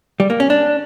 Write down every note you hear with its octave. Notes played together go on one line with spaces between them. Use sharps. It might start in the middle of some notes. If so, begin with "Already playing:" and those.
G3
A#3
C#4
D4